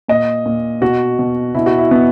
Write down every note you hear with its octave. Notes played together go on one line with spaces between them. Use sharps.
A#2 D#5
A#2
B2 F#4
B2
B2 E4
F#4
E4
B2 B3